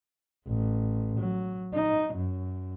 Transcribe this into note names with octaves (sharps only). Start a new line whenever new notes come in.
A1
F#3
D#4
F#2